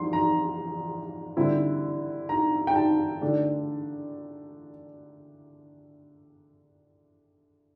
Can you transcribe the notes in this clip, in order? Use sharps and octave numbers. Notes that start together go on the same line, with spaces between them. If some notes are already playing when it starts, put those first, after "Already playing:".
Already playing: F2 E3 G3 C6
A#5
D3 G3 C4 E4
A#5
G5
A5
D3 A3 D4